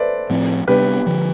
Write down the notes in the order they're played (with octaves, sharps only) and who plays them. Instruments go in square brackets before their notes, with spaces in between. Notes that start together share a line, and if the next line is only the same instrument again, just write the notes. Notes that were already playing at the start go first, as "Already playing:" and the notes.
Already playing: [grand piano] A4 B4 C5 D5 E5
[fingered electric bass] A2 F3 C4
[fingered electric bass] C3 G3 B3 D4 [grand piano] G4 B4
[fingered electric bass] D3 F3